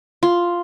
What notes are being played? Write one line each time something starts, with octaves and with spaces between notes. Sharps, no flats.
F4